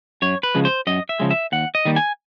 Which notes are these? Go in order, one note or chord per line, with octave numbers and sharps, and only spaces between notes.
F#2 C#5
B4
C#3 F3 G#3
C5
F#2 D#5
E5
C#3 F3 G#3
E5
D#2 F#5
D#5
D#3 G3 A#3
G#5